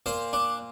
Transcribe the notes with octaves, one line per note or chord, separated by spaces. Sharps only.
A#2 C5
D4